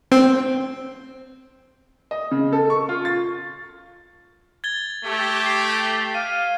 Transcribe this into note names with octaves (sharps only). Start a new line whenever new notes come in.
C4
D#5
C#3
A4
C#6
F4
A6
G#6 A6 G7
A3 G4
C7
F5 D#7